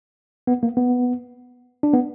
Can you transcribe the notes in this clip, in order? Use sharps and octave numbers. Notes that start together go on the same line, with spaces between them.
B3
A#3
B3
D4
B3